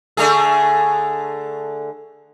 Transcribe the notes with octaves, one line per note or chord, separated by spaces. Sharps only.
D3 A3 G#4